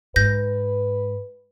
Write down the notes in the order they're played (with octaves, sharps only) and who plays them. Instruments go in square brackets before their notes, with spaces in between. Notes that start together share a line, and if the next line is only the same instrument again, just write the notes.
[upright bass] G#2 [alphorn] B4 [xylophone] G6 A#6